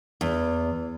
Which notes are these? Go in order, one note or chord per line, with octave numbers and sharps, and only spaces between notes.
E2